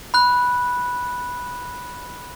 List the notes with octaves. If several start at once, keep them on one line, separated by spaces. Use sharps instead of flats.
B5 F#6